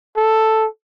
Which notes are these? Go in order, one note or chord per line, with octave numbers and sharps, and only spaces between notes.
A4